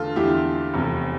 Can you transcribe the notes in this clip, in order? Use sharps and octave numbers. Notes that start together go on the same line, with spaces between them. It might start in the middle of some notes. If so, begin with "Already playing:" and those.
Already playing: E2 D3 A3 F4 A4
E2 D3 F3 A3 E4 G4
F1 E2 C3